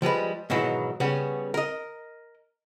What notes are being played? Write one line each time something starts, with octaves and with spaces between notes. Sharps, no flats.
F3 G3 G#3 B4
G#2 B2 D#3 E3 F#3
C#3 G3 B3 C#4
A#4 D#5